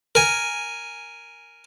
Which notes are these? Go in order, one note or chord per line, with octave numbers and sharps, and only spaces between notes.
A#4 G#5